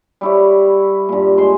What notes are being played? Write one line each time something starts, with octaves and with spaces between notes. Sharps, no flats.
G3 E4 C#5
G2 A#2
G#3 C5 C6